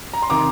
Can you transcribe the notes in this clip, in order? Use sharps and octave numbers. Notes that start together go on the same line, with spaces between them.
A#5
C6
C3 D#3 A#5 D6